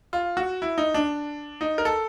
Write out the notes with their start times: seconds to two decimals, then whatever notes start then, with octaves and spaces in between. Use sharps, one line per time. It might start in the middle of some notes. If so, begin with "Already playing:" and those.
0.13 F4
0.37 F#4
0.62 E4
0.78 D#4
0.94 D4
1.61 D#4
1.78 A#4
1.85 A4